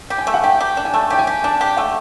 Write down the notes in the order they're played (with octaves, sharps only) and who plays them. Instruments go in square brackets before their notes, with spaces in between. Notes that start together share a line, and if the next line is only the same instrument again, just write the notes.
[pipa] G4
[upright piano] G#5
[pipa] A3
[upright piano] F#5
[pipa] G4 [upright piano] G5
[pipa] G4
D4
[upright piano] G#5
[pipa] A3 [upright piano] A5
[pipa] G4 [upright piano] G5
[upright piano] G#5
[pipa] G4
[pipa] D4 [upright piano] A5
[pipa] G4
[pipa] A3 [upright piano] F#5